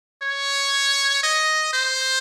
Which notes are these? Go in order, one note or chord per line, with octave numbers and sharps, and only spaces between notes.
C#5
D#5
C5